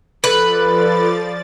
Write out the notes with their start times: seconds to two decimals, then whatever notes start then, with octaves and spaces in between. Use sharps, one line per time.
0.24 F3 A4 B4 D5 A6